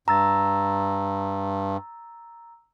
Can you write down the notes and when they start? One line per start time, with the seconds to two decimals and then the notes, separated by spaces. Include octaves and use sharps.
0.08 G2 A#5 E6 A6